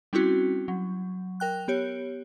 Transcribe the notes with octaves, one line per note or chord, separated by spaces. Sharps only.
G3 C4 C#4 E4 F#4
F#3
A#4 G5 F#6
B3 G4 C#5